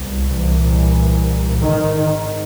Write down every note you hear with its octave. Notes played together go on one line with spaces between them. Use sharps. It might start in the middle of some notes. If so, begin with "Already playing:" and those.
Already playing: C2 B2
C2 A#2 E3
G#1 G#2 D#3
D#3